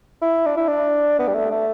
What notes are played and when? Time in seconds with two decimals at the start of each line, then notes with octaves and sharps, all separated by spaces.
0.22 E4
0.46 D4
0.57 E4
0.68 D4
1.19 B3
1.28 G3
1.35 A3
1.51 A3